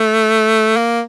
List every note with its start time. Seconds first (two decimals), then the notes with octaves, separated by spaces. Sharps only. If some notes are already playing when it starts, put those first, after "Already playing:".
Already playing: A3
0.76 A#3